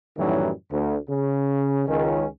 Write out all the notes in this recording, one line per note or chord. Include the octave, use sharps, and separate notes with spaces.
F#2 A2 D#3 E3 F#3 G3
D2
C#3
C#2 D#3 C#4